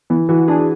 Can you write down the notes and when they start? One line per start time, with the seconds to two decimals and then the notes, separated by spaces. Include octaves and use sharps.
0.10 E3 B3
0.29 E3 F#4
0.48 D4 G#4